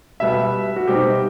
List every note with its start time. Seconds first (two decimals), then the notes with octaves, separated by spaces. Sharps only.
0.20 B2 G3 B3 E5
0.76 F#4
0.87 B2 G3 C4 D#4 G4